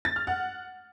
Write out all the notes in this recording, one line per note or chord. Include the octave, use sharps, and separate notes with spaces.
A6
F6
F#5